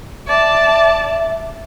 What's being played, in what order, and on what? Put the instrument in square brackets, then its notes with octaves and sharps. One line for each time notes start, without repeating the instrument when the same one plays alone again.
[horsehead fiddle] D5 A5 [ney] E5